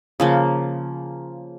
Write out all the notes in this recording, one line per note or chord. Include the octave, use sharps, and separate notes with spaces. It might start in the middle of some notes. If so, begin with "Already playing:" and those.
C#3 F3 A#3